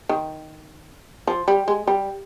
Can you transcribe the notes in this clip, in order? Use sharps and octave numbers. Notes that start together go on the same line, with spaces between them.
D#3
F3
G3
G#3
G3